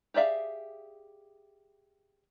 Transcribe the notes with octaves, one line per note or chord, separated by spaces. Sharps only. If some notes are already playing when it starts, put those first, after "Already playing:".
G4 G#4 D5 E5 F5